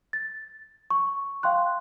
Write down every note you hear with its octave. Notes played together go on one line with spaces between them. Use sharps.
A6
C#6
F5 G5 C6 F#6